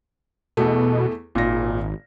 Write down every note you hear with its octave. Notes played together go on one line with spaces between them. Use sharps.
E2 B2 A3
G#1 A#2 A#6